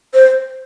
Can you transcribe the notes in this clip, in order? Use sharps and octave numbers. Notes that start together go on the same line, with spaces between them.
C5